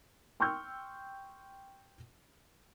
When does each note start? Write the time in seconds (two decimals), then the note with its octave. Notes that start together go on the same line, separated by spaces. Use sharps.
0.40 G5 C6 C#6 E6 F6 G6